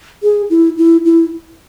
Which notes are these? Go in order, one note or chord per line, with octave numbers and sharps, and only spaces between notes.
G#4
E4
E4
E4